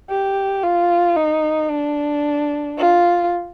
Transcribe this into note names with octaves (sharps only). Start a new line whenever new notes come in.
G4
F4
D#4
D4
F4